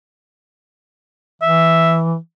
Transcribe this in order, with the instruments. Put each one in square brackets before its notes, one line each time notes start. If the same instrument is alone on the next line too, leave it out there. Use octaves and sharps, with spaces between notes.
[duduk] E3 [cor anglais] E5